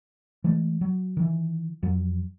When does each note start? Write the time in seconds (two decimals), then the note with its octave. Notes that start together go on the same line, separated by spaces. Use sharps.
0.44 E3 G#3 A3
0.81 F#3
1.17 D#3 E3
1.83 F2 F#3